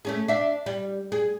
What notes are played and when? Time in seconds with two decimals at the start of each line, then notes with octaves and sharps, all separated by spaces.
0.05 A3 C#4 G#4
0.28 D4 E5
0.66 G3
1.12 G#4